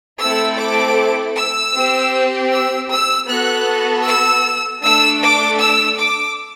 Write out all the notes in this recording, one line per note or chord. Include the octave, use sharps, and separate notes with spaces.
A3 C4 E4 A4 E6
D6
E6
C4 G4
E6
E6
B3 F#4 A4 F#6
E6
A3 D4 A4 E6
D6
E6
D6